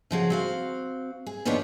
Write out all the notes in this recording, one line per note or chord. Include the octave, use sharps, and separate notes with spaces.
C#3 F3 F#4 G#4
C4 F#4 F5
G#4
D#2 F3 B3 D4 G4 C#5